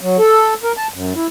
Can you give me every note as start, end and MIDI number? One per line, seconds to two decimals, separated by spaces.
0.01 0.17 54
0.19 0.54 69
0.63 0.72 70
0.77 0.87 81
0.94 1.13 42
1.16 1.27 64